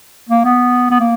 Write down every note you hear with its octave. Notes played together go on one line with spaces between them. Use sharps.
A#3
B3
B3
A#3